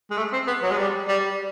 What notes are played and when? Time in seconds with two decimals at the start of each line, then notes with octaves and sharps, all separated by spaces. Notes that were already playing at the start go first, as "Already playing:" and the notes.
0.10 G#3
0.17 A3
0.33 C4
0.47 B3
0.63 F#3
0.71 G#3
0.78 G3
1.08 G3